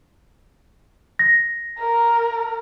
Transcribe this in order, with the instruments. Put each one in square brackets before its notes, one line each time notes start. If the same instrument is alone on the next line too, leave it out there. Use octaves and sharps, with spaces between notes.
[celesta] A#6
[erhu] A#4